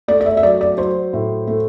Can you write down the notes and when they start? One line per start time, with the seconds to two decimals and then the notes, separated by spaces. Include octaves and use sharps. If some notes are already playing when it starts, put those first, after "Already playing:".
0.08 A3 D5
0.21 D5
0.26 E5
0.37 E5
0.43 F#3 D5
0.61 D5
0.78 F#3 C5
1.13 A2
1.47 A3